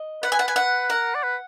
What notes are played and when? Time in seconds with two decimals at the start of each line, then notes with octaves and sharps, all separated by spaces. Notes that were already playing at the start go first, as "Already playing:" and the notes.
Already playing: D#5
0.23 B4 F#5
0.32 G#5
0.39 F#5
0.48 G#5
0.56 F#5
0.90 A#4 F#5
1.15 D5
1.23 B4